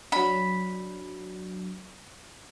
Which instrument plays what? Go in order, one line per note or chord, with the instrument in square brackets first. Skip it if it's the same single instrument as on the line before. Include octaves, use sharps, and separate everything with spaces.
[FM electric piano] F#3 D4 [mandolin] B5